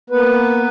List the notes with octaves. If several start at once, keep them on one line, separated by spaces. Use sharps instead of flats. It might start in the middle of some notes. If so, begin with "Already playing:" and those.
A#3 B3 B4